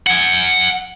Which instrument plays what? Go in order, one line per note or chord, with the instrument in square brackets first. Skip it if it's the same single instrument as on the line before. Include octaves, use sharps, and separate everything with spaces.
[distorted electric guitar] F#5 G#5